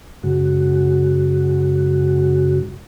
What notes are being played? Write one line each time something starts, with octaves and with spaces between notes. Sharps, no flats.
F#2 C#3 G#3 F#4